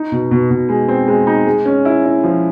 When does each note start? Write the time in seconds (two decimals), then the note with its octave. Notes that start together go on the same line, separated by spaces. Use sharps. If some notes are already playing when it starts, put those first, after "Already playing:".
Already playing: D#4
0.12 B2
0.31 B2
0.50 B2
0.69 G#3
0.88 C4
1.08 G#3
1.27 D#4
1.47 G#3
1.65 C#4
1.85 E4
2.05 E4
2.23 F3